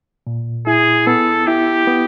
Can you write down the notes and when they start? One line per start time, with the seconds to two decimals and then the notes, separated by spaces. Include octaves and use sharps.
0.27 A#2
0.67 E4 G#4
1.07 B3 A4
1.47 E4 G4
1.87 B3